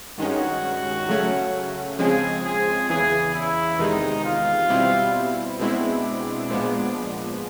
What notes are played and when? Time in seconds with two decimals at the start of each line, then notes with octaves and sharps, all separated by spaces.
0.18 G2 D#3 G#3 C#4 F#4
1.08 C#3 F#3 A3 C#4
1.98 C#3 F3 G#3 C4 G#4
2.45 G#4
2.89 E2 C#3 E3 G#4
3.34 E4
3.79 E2 C3 D#3 G#3 D#4
4.24 F4
4.70 B2 G3 C4 E4
5.59 B2 G#3 C4 D4 E4
6.50 A#2 F3 G#3 B3